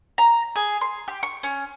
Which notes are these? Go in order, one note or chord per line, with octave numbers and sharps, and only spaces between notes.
A#5
G#4
C6
G4
C#6
C#4